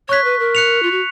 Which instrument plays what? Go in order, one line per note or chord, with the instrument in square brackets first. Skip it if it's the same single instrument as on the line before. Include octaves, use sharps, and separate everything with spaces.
[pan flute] C#5 [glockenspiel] C#6 F#6 B6
[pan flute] B4
A#4
[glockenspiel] F#6 C#7 F7
[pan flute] F4
F#4